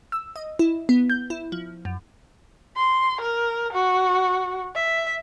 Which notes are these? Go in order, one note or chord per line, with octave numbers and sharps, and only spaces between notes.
E6
D#5
E4
B3
G6
E4
F3
F#2
C6
A#4
F#4
E5